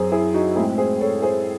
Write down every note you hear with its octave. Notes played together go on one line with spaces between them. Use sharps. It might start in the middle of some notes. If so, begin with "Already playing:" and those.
Already playing: F#2 C4 G#4 C5
E4 G#4
D#4 F#4
A2 G#3 C4 E4 G#4
G#4 C5
A4 C#5
G#4 C5